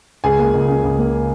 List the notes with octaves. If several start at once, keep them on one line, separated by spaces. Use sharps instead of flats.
C#2 G#4 G#5
A#3
C#2
C#3
C#2
A#3